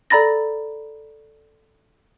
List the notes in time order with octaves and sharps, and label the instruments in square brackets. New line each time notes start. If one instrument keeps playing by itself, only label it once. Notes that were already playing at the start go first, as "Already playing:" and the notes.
[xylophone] A4 D5 A#5 B5 A6 A#6